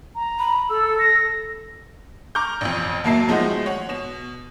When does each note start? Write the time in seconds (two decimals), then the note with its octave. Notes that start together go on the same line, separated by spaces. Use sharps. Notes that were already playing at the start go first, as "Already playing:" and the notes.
0.15 A#5
0.39 B5
0.70 A4 E6
0.99 A#6
2.35 A#5 C#6 D6 F6 G6
2.61 A1 F2
3.04 D#2 F#3 A#3 E4 A5 C7
3.28 D#3 F3 G#3 A3 D#4 F#4
3.66 C#5 F#5
3.89 B2 E7